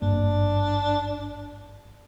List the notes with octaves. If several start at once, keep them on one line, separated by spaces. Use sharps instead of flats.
G#1 G2 A#3 D4